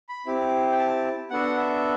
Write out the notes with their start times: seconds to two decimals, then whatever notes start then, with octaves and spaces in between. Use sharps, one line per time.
0.09 B5
0.26 C4 E4 G4
0.72 G5
0.78 A5
1.30 B3 D4 F#4 A4 F#5
1.57 E5